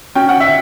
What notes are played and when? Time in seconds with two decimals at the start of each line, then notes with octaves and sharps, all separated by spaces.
0.15 C#4 G5
0.29 F#5
0.40 E5